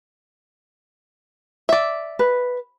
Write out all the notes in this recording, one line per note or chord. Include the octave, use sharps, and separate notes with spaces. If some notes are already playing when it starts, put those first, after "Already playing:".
D5 E5
B4